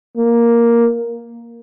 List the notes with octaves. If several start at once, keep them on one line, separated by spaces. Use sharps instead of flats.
A#3